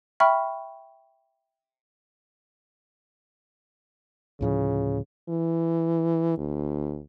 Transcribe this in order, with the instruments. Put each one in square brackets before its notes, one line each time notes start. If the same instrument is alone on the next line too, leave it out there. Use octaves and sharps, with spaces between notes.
[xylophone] E5 G5 B5 C#6 F6
[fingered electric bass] D2 A2 F3 [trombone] C#3
[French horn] E3
D2